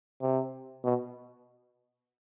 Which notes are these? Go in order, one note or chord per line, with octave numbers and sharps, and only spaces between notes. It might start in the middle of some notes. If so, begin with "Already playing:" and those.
C3
B2